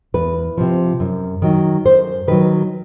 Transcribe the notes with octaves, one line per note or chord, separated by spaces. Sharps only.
E2 B4
C3 F3
F#2
D#3 F#3
F#2 C5
D#3 F#3 B4